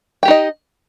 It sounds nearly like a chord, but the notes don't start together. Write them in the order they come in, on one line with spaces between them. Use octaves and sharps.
G5 G4 D#4 D#5